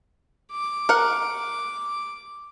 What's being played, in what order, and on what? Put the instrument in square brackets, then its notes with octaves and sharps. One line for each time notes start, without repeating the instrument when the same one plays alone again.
[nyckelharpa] D6
[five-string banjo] A#4 F#5